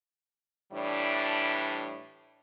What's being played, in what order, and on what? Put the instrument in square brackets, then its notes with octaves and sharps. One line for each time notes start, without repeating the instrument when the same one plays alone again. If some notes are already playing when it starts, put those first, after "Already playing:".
[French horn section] A2 E3 G3 D4